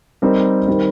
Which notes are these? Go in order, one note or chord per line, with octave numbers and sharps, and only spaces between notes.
G3 C4 D#4 G4 A#4
D#3 G3 C4